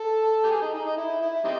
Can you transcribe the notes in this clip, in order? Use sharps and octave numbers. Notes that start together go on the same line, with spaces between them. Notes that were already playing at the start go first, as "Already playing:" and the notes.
Already playing: A4
G4
G#4
D#4
D#4
D#4
E4
E4
G3 C4 D#4